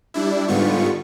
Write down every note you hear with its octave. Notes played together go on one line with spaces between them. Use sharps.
G3 D4 E4
G#2 D3 G3 B3 F4 C#6